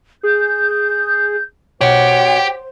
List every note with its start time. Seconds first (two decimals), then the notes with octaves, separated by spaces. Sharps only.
0.23 G#4 G6
1.81 B2 G4 C5 C#5 F#5